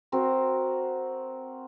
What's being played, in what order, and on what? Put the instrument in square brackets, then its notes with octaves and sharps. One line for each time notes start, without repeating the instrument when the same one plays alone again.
[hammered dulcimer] C4 F#4 A#4